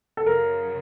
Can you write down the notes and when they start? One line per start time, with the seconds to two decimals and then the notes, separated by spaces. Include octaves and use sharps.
0.17 A4
0.26 F#2 C#3 F#3 A#4